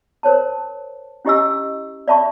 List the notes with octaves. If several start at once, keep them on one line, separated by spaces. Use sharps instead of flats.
A#4 C5 C#5 A5
C#4 E4 G4 D#5 G#5 E6
D5 E5 A5 B5 C#6